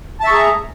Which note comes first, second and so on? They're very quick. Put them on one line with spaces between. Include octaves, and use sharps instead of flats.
A5 E5 C#6 G#4 A#5